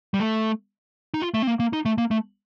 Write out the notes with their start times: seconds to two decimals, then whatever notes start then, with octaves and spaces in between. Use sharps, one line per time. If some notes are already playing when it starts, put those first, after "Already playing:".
0.14 G3
0.20 A3
1.14 D#4
1.22 F4
1.34 A3
1.42 C4
1.47 A#3
1.60 A#3
1.73 D#4
1.85 A3
1.98 A#3
2.11 A3